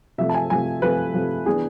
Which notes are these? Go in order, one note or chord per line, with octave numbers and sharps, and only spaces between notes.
C3 F3 A3 E5
A5
G#5
C3 F3 A3 G#5
C3 F3 A3 B4
C3 F3 A3
E3 B3 D4 G#4